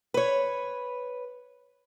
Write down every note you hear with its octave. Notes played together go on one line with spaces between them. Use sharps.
B4 C#5